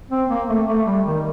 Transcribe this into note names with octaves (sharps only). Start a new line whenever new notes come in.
C4
A#3
A3
A3
G3
D#3